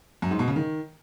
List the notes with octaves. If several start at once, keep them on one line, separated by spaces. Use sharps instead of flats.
F#2
G#2
B2
C#3
D#3